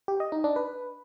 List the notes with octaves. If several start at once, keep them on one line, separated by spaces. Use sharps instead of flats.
G4
D#5
D#4
D4
B4